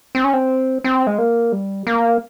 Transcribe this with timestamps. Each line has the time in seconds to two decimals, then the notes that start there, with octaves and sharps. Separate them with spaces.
0.15 C4
0.24 C#4
0.33 C4
0.84 C4
1.07 G#3
1.18 A#3
1.52 G3
1.87 A#3